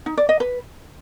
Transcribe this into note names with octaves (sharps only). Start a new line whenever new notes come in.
D#4
D5
D#5
B4